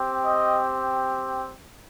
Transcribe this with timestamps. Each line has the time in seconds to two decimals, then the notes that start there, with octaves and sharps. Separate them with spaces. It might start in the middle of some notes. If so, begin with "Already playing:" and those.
Already playing: C4 G4
0.26 D#5